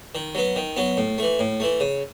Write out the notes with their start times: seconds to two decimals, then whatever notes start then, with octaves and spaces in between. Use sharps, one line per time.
0.15 D#3
0.35 F#3 B3
0.56 D#3
0.76 F#3 B3
0.97 A2
1.18 E3 A3
1.39 A2
1.60 E3 A3
1.80 C#3